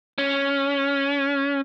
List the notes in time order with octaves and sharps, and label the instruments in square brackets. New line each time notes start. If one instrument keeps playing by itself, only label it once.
[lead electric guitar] C#4